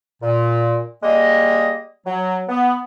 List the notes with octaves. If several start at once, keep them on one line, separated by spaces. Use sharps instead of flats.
A#2
G3 G#3 A#3 D#5
F#3
B3